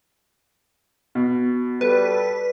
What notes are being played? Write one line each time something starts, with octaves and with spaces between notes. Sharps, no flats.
B2
G3 A4 B4